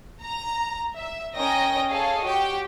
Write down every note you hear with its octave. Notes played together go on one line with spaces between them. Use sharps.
A#5
E5
C#4 A#4 D#5 G5 A#6
G#4 A4 C#5 D#5 F5
F#4 G4 G5